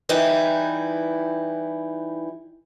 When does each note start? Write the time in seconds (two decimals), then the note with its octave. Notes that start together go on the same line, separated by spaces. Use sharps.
0.09 E3 G3 D#4 E4